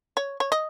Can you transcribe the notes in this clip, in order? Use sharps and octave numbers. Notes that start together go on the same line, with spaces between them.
C#5
C#5
D#5